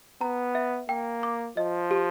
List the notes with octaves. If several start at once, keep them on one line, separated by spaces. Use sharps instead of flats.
B3 A#5
E5
A#3 G5
D6
F3 D#5
G4